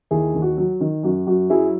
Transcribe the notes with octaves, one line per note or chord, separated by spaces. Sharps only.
D#2 E4 G#4
D#2
F#4
F#3
D#3
F#2 F#4
F#2 F#4
F#3 E4 G#4